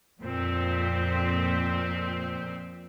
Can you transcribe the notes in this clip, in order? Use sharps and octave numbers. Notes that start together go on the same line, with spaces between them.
F2 A#2 C4